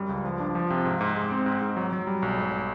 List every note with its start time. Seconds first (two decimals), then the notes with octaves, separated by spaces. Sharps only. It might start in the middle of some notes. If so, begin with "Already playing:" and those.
Already playing: F#2 G3
0.09 C#2
0.24 F3
0.40 D4
0.55 F3
0.70 C3
0.85 G#2
1.01 G#2
1.15 G#3
1.31 C4
1.46 G#2
1.61 G#2
1.77 F#3
1.93 F#3
2.07 G3
2.22 B1
2.37 G#2